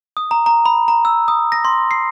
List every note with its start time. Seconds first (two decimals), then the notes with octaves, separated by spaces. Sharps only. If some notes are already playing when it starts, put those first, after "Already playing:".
0.17 D#6
0.31 A#5
0.46 A#5
0.66 B5
0.88 A#5
1.05 E6
1.28 D#6
1.52 A#6
1.65 C6
1.91 C7